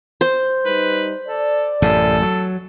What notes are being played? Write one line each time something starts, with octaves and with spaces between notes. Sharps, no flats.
C5
G3 D#4 B4
A4 D5
A1 F#2 C3 A4
F#3